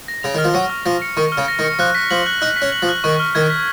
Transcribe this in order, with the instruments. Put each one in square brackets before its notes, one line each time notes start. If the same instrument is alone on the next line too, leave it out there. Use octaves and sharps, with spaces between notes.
[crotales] A#6
[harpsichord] C#3 [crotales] F7
[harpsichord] D#3 [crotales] F6
[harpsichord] F3
[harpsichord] F#3 [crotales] C#6
[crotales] F6
[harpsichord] F3 [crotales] A#6
[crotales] C#7
[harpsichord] D#3 [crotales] C#6
[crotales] F6
[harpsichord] C#3
[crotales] A#6
[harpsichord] D#3
[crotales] C#7
[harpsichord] F3 [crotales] F#6
[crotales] B6
[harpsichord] F3 [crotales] F#7
[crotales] F#6
[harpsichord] D#4 [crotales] F#6
[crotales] B6
[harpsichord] C#4
[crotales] F#7
[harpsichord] F3
[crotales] F#6
[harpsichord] D#3 [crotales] C#6
[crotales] F6
[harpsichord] D#3 [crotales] G#6
[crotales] B6